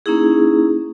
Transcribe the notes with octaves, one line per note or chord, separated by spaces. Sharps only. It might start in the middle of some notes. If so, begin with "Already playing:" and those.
A#3 C#4 D#4 E4 G#4